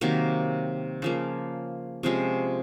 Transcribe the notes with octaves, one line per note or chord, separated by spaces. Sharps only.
C3 D#3 F#3 A#3
C#3 F3 A#3
C3 F3 G#3 C#4